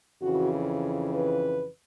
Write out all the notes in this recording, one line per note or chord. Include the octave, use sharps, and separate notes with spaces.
F2 C#3 E3 F#4
B4